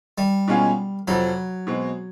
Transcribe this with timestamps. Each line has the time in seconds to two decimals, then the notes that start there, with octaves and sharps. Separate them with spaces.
0.18 G3
0.48 B2 G#3 C#4 F4 G#4
1.07 F2 C3 F3 F#3
1.67 B2 G#3 C4